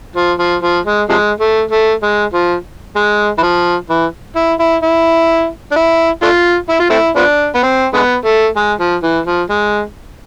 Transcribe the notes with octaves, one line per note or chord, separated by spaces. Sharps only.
F3
F3
F3
G#3
C3 F3 G#3
A3
A3
G#3
F3
G#3
E3
F3
E3
E4
E4
E4
D4
E4
A3 D4 F4
E4
F4
A3 C4 E4
F3 B3 D4
B3
C4
D3 G#3 B3
A3
G#3
F3
E3
F3
G#3